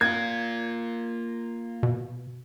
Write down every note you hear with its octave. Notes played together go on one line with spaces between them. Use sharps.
A#3 F4 G#6
B2